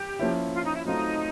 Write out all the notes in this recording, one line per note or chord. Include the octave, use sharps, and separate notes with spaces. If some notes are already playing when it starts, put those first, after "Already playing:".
Already playing: G4
F3 A#3 C#4 E4
F4
D#4
E4
F#3 A3 C4 D#4 F4